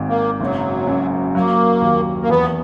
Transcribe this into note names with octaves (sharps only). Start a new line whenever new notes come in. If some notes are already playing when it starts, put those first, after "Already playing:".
Already playing: G#1 G#2
A#3
F#1 F#3
F#2
F#3 A#3
D#2
A#3
E2 B3